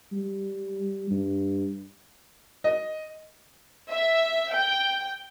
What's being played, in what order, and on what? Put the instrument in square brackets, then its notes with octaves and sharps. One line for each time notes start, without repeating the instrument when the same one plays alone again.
[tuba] G3
G2
[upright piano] D#5
[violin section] E5
G5